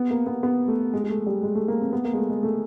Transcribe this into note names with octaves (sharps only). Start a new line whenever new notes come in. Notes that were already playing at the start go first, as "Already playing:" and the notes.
Already playing: B3
A#3
B3
B3
A3
G#3
G#3
A3
G3
G#3
A3
A#3
C4
B3
A#3
G#3
A3
G#3
A3